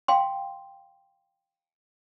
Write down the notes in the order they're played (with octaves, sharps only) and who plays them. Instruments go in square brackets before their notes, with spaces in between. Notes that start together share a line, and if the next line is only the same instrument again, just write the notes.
[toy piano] F5 G5 C6